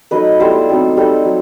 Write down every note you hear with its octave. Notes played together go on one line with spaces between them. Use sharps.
F#3 A3 D#4 B4 D#5
G3 B3 E4 A4 C5
F#3 A3 C4 D#4
G3 D#4 A4 C5
F#3